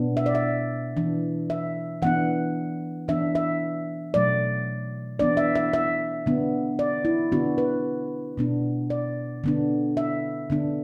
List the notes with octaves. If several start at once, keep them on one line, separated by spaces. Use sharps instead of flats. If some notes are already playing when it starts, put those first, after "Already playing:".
Already playing: B2 B3 D4
E5
D5
E5
E3 D4
E5
E3 B3 D4 F#5
E3 B3 D4 E5
E5
B2 F#3 A3 D5
E3 B3 D4 D5
E5
E5
E5
D3 B3 D4
D5
E4
D3 B3 D4 F#4
B4
B2 B3 D4
D5
D3 B3 D4
E5
D3 B3 D4